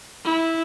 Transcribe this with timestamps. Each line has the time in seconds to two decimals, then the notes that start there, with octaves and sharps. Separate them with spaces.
0.25 E4